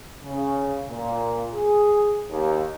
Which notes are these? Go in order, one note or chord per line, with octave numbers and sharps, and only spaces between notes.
C#3
A#2
G#4
D#2